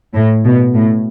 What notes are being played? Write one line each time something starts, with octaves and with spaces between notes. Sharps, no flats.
A2
B2
A2